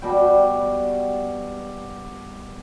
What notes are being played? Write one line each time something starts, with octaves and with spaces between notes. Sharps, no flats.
B2 G3 G5